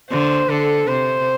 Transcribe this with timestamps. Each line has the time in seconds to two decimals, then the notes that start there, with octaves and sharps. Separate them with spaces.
0.10 D3 C5
0.49 D3 A4
0.88 C3 C5